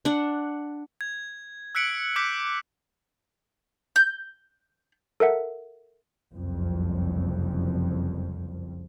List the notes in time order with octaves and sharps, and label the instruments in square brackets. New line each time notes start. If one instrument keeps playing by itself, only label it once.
[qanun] D4 F#5
[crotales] G#6
E6 F#6 B6 C#7 D7 F#7
D6 F#6 G6 B6 C#7
[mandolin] G6
[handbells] A4 A#4 E5 F#5
[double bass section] F#1 C2 F2